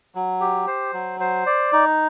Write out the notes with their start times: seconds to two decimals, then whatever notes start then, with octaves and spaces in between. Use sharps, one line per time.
0.15 F#3
0.41 G4
0.67 C5
0.93 F#3
1.20 C5
1.46 D5
1.73 D#4